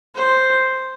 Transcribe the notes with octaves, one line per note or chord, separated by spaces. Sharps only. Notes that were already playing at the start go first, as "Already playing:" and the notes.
C5